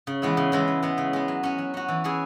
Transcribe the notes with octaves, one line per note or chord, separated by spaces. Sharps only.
C#3
E3 G#3 B3 E4
C#3
E3 G#3 B3 E4
C#3
G#3 B3
C#3
G#3 B3
F#3
C#4 F#4
F#3
C#4 F#4
E3
C#4 E4 G#4